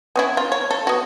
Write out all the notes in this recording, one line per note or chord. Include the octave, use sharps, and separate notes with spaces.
B3 C#4 E4
F4
C#5
A4
B3 F#4